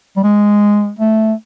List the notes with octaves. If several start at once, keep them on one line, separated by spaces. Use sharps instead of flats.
G3
G#3
A3